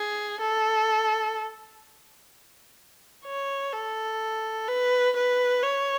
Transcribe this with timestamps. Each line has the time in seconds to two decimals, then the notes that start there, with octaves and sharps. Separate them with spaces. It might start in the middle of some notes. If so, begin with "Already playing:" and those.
Already playing: G#4
0.40 A4
3.25 C#5
3.73 A4
4.68 B4
5.16 B4
5.63 C#5